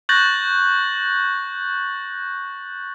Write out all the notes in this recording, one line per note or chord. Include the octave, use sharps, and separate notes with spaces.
C#6 F#6 G6 A6 A#6 F#7